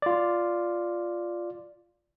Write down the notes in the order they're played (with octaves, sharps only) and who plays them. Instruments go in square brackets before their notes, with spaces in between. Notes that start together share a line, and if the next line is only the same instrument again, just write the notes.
[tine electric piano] F4 D5